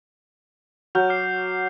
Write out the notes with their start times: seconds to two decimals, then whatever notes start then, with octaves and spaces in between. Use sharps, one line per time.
0.95 F#3 F6 G6 F7
1.09 D6 F6 C7